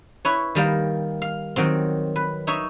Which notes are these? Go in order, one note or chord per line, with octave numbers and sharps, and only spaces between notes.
E4 B4 C#5
D#3 G3 A#3
F5
D#3 F#3 C4
B4
D#4 C#5 E5